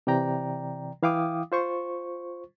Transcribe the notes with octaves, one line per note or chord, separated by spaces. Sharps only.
C3 E3 D5 G5 A#5
E3 E4 F5 G5 D6 D#6
F4 C5 C#6